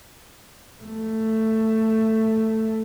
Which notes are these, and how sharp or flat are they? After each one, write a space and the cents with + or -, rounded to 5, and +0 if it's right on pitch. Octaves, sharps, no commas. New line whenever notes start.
A3 +10